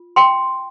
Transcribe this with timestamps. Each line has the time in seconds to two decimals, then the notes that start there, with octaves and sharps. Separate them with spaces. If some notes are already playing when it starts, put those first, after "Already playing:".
Already playing: F4
0.16 G5 C6